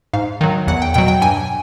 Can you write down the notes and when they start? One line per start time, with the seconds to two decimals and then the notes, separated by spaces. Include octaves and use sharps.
0.13 G#2 F5
0.41 D#3 F#3
0.67 E2 F#5
0.82 G5
0.94 B2 F#3 G5
1.08 G5
1.21 G2 G#5